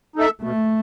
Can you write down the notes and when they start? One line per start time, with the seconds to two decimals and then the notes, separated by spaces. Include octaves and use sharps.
0.16 D#4 A4 E5
0.42 B2 A3